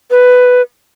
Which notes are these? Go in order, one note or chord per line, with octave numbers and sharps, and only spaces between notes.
B4